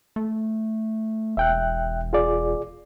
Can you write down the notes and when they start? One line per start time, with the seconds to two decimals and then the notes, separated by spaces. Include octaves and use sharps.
0.16 A3
1.37 E1 E5 G5 F#6
2.13 F4 G#4 D5